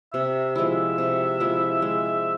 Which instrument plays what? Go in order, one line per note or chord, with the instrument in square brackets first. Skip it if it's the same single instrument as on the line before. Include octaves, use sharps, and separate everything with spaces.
[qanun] C3 [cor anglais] E5
[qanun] F3 G#3 E4 [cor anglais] E5
[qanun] C3
F3 G#3 E4
G#3